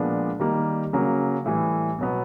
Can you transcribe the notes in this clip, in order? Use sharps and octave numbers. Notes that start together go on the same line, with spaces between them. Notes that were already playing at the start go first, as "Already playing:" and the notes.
Already playing: A#2 F3 G#3 B3 D4
D#3 G3 A#3
C#3 F#3 A#3
A2 E3 G3
B2 F#3 B3